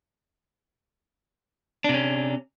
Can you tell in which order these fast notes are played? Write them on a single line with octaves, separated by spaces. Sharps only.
D4 C3 C#4